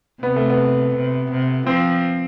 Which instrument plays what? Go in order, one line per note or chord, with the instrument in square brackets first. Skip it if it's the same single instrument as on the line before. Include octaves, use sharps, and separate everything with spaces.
[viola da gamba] C3 [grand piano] B3
[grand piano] A3
B3
[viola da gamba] C3
C3
[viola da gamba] F3 [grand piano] C4